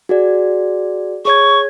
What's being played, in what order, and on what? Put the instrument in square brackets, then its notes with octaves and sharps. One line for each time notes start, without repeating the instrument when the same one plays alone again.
[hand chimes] F#4 G#4 D5
[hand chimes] G#4 C#5 G#6 [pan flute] C#6